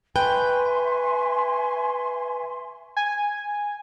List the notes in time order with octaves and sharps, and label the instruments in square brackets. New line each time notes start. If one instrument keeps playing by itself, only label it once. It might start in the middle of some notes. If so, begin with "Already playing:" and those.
[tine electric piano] B4 [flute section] E5 C6 C#6 [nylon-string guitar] G5 [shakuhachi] G#5
[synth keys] G#5